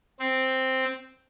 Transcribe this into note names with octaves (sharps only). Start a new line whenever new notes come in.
C4